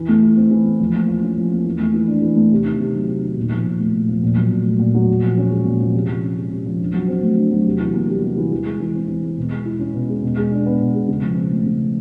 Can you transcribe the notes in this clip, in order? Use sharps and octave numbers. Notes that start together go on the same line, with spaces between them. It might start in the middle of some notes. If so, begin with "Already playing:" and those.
Already playing: E3
A3
E4
C4
E3
A3
F3
A#3
F4
C#4
F3
A#3
E3
A3
E3
D4
E3
A3
C3
D#3
C3
F#3
C3
D#3
A#2
F3
A#2
A3
A#2
F3
A#2
F#3
A#2
A3
A#2
F#3
A#2
F3
C#4
G#3
A#2
F3
C3
F3
C#4
G#3
C3
F3
D3
F#3
C4
A3
D3
F#3
C3
E3
A#3
G3
C3
E3
E3
G#3
E3
C4
E3
G#3
B2
G#3
E4
C#4
B2
G#3
B2
G#3
D4
B3
B2
G#3
C#3
F3
C4
A3
C#3
F3